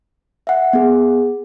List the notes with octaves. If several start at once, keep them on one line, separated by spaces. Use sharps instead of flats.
E5 F#5
B3 G#4